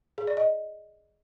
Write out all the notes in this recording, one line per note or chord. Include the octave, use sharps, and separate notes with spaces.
G#4
D5
D#5